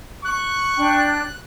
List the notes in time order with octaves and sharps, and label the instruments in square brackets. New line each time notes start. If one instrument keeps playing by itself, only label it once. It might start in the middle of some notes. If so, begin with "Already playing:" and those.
[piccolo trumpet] C#6 [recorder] F#6
[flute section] D4 G5